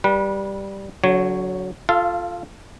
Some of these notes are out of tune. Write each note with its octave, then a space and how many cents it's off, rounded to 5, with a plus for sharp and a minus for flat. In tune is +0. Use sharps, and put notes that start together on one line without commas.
G3 +0 B4 -30
D3 -40 F#3 +0 C#5 +0
F4 +0 A4 +0 F5 -25